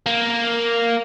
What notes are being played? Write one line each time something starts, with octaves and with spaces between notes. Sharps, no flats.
A#3